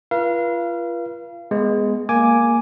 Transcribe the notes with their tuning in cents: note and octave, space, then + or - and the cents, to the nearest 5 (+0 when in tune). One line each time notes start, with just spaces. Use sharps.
F4 -30 B4 -40 F5 -30
G#3 +0 B3 +0 B4 +0
A#3 +0 G#5 +0 D6 +0